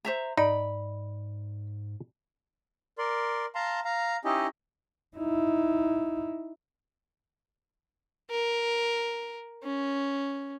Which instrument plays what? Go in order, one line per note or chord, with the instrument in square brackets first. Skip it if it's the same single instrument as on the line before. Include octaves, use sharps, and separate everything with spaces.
[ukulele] C5 E5 A#5
[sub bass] G#2 [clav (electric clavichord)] D#4 [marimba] D5 D#5 [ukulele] B5
[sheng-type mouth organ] A#4 D5 C6
F5 A5 A#5 C6
F5 A#5
C#4 D#4 E4 G4 D#5
[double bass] D#4 E4
[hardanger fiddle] A#4
C#4